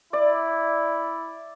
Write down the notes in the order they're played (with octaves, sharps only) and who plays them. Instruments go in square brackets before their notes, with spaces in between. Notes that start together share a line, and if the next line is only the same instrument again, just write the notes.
[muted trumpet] E4 [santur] D5